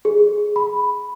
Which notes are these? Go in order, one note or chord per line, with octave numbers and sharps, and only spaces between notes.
G#4
B5